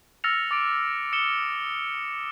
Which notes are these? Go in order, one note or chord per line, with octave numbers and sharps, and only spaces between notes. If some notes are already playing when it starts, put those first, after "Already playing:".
E6 F6 A6 A#6 C#7 F7
D6 A6 D7
D#6 C#7 E7 G7